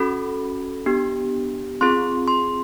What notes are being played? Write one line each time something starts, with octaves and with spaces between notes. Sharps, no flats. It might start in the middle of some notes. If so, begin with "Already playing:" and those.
Already playing: C#4 F#4 A4 B5
B3 D4 G4
C4 F4 G#4 C6
C6